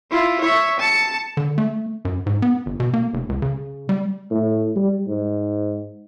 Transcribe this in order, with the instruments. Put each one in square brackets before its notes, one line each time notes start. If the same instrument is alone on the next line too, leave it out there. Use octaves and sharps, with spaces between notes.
[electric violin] E4 F4
C#5 E5
A5 C#7
[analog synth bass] D3
A3
F#2
G#2
B3
G1
B2
A#3
F1
C#2
C#3
G3
[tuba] A2
G3
G#2